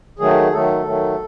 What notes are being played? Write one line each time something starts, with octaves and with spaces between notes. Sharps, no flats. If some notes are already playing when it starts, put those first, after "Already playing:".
D#3 F#3 A3 G#4
D#3 F#3 A3 A4
D#3 F#3 A3